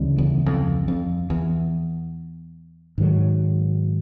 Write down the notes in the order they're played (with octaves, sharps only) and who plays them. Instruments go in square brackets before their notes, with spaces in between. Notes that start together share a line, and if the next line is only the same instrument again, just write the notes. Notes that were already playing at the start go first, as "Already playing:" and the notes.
Already playing: [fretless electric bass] D2 C#3 E3 G3
[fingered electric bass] E2
F2
F2
E2
[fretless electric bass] G#2 D#3 F#3